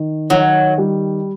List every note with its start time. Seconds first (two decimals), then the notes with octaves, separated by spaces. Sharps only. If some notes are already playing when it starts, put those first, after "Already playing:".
Already playing: D#3
0.30 D#3 F#3
0.78 G3